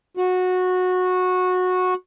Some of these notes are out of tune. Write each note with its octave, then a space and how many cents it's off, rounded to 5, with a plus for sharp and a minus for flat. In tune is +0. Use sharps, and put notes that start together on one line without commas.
F#4 -15